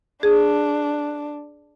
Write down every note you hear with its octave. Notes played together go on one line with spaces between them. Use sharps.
D4 G#4